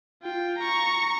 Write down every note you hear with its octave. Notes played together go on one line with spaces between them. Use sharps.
F4 G5
A#5 C#6